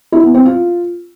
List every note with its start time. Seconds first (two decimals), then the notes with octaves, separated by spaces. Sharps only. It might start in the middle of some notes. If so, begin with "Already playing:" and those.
0.12 E4
0.23 B3
0.34 C4
0.45 F4